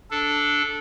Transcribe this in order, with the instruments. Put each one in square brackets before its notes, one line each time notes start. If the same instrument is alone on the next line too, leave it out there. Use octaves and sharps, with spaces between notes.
[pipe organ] D4 A4